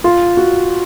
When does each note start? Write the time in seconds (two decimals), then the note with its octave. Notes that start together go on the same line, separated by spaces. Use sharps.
0.04 F4
0.37 F#4